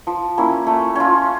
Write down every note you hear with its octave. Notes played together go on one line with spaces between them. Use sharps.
F3
A#3 C#4 E4
A3
C#4 F4